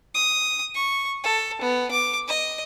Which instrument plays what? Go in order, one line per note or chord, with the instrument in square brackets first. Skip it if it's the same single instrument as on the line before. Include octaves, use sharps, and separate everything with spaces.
[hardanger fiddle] D#6
C#6
A4
B3
D6
D#5